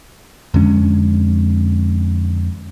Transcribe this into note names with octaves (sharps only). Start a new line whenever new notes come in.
F2 D3 G#3 C#4